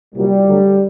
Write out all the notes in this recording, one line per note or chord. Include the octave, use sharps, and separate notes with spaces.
C2 A#2 F#3 G3
D2 D3 F#3